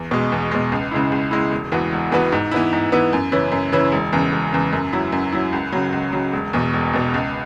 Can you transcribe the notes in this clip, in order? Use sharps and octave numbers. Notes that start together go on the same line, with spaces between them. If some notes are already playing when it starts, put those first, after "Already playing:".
Already playing: E2
B2 G#3
E2
B2 G#3
C#2
C#3 G#3 E4
C#2
C#3 G#3 E4
E1
E2 E3 B3 F#4
E1
E2 E3 B3 F#4
G#2
E3 B3 E4
G#2
E3 B3 E4
F#2
C#3 E3 C#4 E4
F#2
C#3 E3 C#4 E4
E1
E2 C#3
E1
E2 C#3
F#2
F#3 E4
F#2
F#3 E4
C#2
C#3 F#3
C#2
C#3 F#3
E1
E2 B2
E1
E2 B2
C#2